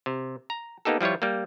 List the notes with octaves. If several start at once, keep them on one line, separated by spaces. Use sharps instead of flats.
C3
A#5
A#3 B3 D#4 G4 A4
F3 G3 E4 F4 C#5
G3 A#3